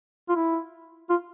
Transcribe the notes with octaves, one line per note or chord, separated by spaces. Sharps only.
F4
E4
F4